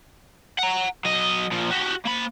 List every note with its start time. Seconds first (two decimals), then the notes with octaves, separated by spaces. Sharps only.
0.59 F#5 A#5
1.05 F#3 D#5
1.52 A#2 F3
1.71 F#4 G4
2.05 A#3 B5